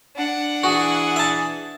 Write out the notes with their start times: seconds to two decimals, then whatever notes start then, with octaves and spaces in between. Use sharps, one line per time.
0.16 D4 F#5
0.64 E3 F#4 G#4
1.16 E5 A5